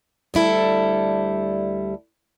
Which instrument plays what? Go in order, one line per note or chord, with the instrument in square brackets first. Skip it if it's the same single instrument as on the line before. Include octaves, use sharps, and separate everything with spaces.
[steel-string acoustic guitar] D2 G3 E4 A4